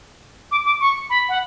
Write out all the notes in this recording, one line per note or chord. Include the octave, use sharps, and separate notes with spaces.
D6
D6
C#6
B5
F#5